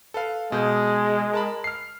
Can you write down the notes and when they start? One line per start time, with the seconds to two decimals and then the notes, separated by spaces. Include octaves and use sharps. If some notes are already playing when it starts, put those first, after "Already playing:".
0.14 A4 B4 F5
0.52 B2 G#3 G6
1.33 A#4 A5 B5
1.64 F6 C7